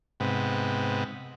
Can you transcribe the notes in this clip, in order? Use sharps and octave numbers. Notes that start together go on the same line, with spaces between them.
G#2 C3 B3